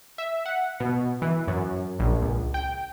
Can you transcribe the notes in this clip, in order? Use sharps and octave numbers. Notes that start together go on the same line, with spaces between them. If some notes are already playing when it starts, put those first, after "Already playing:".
E5
F#5
B2
E3
F#2
A#1
C#2
G5